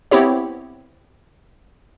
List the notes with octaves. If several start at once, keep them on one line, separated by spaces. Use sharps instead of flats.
B3 C4 E4 G4 C#5